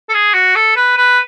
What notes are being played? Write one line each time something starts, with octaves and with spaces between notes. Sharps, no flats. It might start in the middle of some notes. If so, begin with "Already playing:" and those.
A4
G#4
F#4
A4
B4
B4